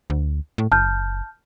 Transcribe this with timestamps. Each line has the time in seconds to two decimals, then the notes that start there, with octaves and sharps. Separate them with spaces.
0.10 D2
0.58 A2
0.72 F#1 A5 F6 G6